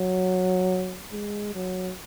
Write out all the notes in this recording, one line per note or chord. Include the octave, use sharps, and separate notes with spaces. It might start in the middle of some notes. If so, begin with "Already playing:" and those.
Already playing: F#3
G#3
F#3